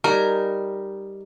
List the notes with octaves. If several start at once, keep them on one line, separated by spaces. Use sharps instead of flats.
G3 D#4 A#4 G#5